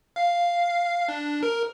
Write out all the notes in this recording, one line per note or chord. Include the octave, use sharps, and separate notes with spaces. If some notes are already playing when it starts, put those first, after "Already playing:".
F5
D4
A#4